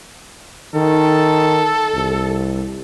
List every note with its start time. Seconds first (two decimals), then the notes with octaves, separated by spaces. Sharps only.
0.74 D#3 A4
1.94 C2